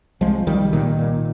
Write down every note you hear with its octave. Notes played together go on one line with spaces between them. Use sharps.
C2 F3 G#3
C2 D#3 G3
A#2 D#3
A#2